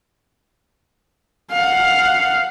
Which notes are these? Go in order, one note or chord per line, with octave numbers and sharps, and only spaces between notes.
F5 F#5